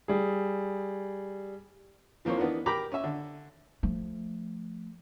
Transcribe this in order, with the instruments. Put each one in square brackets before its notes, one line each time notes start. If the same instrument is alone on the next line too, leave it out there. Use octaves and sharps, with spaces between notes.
[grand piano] G3 G#4
[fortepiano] E3 F3 A#3 C4 C#5
E3 B3 D4 D#4 A#4
G4 A#4 G5 A#5 B5 D6
C#4 E5
D3
[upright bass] F3 A3